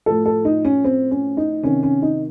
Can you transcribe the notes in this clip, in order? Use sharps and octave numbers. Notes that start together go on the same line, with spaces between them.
A2 F3 A4
A4
D#4
C#4
C4
C#4
D#4
C3 D#3 C#4
C#4
D#4